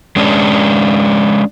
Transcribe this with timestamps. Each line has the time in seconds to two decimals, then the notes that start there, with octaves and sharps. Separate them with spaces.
0.16 G#3 C#4 D4